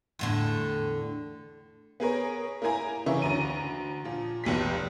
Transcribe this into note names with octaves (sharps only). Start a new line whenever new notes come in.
E2 A2 D3
B3 G#4 A#4 C#5
A#3 E4 A#4 G#5 A#5
C#3 E3 A#3 E5 C#6
D2 A#5 D#7
A#2 F3
F1 B1 G4 B6